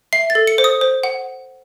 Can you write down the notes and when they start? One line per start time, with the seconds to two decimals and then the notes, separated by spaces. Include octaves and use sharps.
0.13 E5 C7
0.30 A6
0.35 A4
0.47 C#7
0.58 C5
0.64 D#6
0.81 C5
1.03 F#5